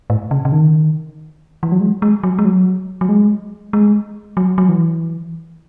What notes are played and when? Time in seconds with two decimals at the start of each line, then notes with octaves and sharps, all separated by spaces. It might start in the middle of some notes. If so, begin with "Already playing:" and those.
0.10 A2
0.31 C#3
0.45 C#3
0.52 D#3
1.63 E3
1.72 F#3
1.81 G#3
2.02 G#3
2.23 F#3
2.39 G#3
2.45 F#3
3.01 F#3
3.09 G#3
3.73 G#3
4.37 F#3
4.58 F#3
4.69 E3